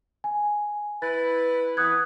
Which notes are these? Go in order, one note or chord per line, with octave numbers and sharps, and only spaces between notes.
G#5
E4 B4 A6
E3 B3 D#6 F#6 G#6